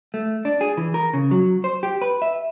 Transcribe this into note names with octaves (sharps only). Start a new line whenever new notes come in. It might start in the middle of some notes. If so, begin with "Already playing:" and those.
A3
D4
G#4
E3
A#4
C#3
F#3
C5
G4
B4
E5